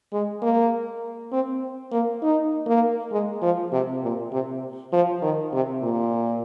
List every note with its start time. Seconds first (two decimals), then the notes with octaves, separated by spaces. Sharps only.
0.13 G#3
0.42 A#3
1.32 C4
1.92 A#3
2.23 D#4
2.67 A#3
3.12 G#3
3.42 F3
3.72 C3
4.03 A#2
4.32 C3
4.93 F3
5.22 D#3
5.53 C3
5.82 A#2